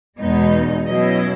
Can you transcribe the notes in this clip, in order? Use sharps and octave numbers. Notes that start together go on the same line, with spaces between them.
E2 B2 G#3 B3 D#4
B2 F#3 C#4 E4 D#5